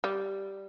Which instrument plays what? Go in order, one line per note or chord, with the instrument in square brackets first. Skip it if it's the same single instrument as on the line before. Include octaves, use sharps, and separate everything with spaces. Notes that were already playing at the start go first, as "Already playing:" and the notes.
[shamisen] G3